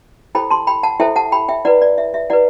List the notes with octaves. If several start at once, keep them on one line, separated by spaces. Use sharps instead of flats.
E4 A4 C5 G5 B5
A5 C6
G5 B5
F#5 A5
E4 A4 C5 E5 G5
F#5 A5
G5 B5
E5 G5
E4 B4 D5 F#5
D5
E5
E5
E4 B4 D5 F#5